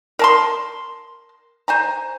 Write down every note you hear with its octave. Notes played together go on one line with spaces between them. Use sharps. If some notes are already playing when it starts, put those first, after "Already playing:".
A#4 A5 C6
C5 G#5 A#5